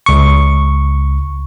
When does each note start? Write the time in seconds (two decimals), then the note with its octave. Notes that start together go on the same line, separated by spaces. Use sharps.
0.06 C#2 C#6